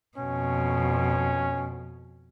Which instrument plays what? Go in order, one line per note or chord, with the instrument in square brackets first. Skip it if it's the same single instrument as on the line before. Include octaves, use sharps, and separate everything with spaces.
[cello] F2 B2 [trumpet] C#4